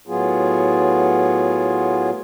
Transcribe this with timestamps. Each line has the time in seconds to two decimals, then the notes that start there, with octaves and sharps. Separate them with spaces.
0.08 A2 F#3 B3 F4 G#4